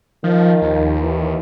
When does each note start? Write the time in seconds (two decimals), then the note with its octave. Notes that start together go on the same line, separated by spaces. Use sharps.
0.24 D#3 F3
0.62 D#2
1.02 E3